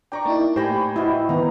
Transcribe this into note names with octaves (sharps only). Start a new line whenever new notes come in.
D4 D5 G5 A#5 C#6
A#3 D#4 E4 A5
A2 G4 C5 G5 G#5 B5 C#6 A#6
E4 F#4 D#5
D#3 B3 A#5